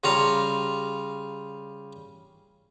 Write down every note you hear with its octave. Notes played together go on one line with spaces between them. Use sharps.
C#3 G3 F4 A#5